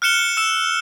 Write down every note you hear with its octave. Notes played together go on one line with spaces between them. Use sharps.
F6 F#6 C#7 E7 G7
E6 E7